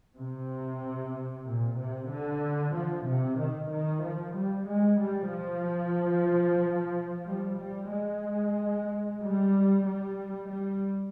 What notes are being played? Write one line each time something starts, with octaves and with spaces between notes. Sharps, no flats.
C3
A#2
C3
D3
F3
C3
D#3
D#3
F3
G3
G#3
G3
F3
G3
G3
G#3
G3
G3
G3